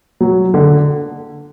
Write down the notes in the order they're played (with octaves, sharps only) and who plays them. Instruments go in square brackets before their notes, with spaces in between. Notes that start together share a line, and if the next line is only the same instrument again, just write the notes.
[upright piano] F#3
D3